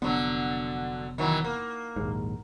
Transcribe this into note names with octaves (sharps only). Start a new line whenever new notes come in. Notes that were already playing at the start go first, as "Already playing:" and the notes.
F1 D3 F#3 B3
D#3 E3 F#3
A#3
A#1 D#2 G#2